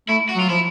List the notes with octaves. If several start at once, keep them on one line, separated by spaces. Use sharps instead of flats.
A3 E4
F#4
F#3 F4
F3 E4